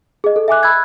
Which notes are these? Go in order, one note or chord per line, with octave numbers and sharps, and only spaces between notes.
G#4 D#5
A4
E5 G#5 D6 F#6
B5 E6 F#6 G#6